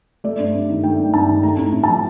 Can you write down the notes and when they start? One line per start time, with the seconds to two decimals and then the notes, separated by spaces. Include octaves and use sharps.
0.24 A3 D5
0.39 G2
0.54 G2
0.69 D#3
0.84 A3 G5
0.99 G2
1.14 G2 A5
1.29 D#3
1.43 A3 A#5
1.58 A2
1.74 A2
1.84 A5
1.89 F3